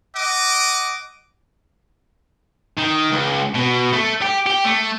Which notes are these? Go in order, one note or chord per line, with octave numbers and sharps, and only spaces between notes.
D#5 F#5 D6
D#3
C#2
B2
A3
G4
G4
A3